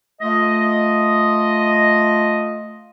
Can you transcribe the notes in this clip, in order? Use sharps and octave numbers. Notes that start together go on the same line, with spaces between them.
A3 F4 D#5